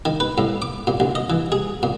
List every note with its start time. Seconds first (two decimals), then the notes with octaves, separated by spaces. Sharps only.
0.05 D#3
0.20 B4
0.38 A2
0.62 D6
0.87 A#2
1.00 D2
1.15 D#5
1.30 E3
1.52 G#4
1.83 A#2